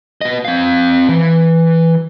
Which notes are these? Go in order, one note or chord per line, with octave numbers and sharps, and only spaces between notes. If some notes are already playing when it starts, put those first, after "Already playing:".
B3 D#5
C4 F5
E3